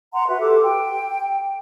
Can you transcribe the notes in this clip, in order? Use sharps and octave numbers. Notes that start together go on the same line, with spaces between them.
F#5 A#5 C6
F#4 B4 E5
G4 A4 D6
G5